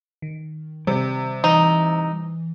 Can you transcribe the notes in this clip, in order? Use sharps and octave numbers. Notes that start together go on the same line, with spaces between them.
D#3
C3 G3
E3 D#4